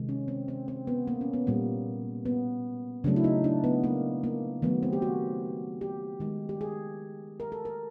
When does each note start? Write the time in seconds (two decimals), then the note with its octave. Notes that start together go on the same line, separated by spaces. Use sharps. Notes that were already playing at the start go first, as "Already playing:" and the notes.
Already playing: C3 D#3 G#3
0.09 C#4
0.28 C4
0.48 C4
0.68 C4
0.87 B3
1.07 A#3
1.21 C#4
1.33 B3
1.47 A#2 G3 A#3
2.25 B3
3.04 C#3 F#3 A3 D4
3.16 E4
3.24 D#4
3.44 D4
3.64 B3
3.84 A#3
4.24 A#3
4.62 D#3 F#3 A3 B3
4.83 C4
4.93 G4
5.02 F#4
5.81 G4
6.20 D#3 G#3
6.49 G4
6.61 G#4
7.40 A#4
7.52 A4
7.65 A#4